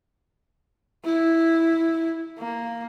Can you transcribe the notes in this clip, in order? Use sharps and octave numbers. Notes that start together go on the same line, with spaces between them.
E4
A#3